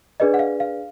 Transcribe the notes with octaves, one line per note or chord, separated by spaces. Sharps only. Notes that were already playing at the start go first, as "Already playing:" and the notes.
D4 G#4 B4 D5 D#5
F#5
F5
F5